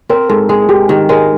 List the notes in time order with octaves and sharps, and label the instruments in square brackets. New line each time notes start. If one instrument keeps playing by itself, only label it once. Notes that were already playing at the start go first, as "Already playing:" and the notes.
[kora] C4 [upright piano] A#4
[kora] G#2 [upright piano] A4
[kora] G#3 [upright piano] G#4
[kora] G#2 [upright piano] G4
[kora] D#3 [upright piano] G4
[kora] G#3 [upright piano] A#4